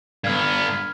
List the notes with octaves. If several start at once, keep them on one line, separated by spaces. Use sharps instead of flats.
G2 B3 F6 G#6